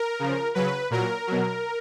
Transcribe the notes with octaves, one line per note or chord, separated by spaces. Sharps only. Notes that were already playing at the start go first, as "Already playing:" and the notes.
Already playing: A#4
C#3 F3
C#3 F#3 B4
A#2 F#3 A#4
B2 F#3